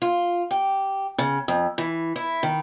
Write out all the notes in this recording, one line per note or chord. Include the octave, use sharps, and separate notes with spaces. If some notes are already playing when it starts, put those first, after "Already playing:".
F4
G4
C#3
F2
E3
E4
D#3